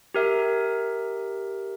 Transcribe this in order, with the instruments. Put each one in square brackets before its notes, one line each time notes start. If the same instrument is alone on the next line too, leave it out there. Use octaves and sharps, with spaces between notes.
[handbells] G4 A#4 E5